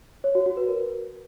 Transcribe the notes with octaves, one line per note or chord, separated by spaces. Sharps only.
C#5
F#4
F#4
B4
A#4